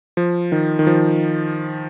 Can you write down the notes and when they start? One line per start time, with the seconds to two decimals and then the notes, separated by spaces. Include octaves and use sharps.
0.17 F3
0.52 D#3
0.79 D#3
0.87 F3